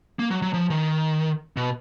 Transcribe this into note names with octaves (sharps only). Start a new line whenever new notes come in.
A#3
F#3
F#3
F3
D#3
B2